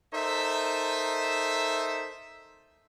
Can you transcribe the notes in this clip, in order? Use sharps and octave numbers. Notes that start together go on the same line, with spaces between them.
D#4 A4 A#4 C5 E5